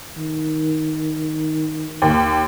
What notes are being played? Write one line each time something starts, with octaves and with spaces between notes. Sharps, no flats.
D#3
D#2